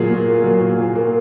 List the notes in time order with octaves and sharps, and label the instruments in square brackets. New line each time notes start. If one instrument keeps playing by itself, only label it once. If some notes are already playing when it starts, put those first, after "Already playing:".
Already playing: [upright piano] A#2 F#3 F4 G#4
A#2
A#3
F#3
A#2
A#2
A#3